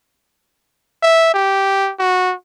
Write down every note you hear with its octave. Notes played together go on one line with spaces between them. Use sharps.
E5
G4
F#4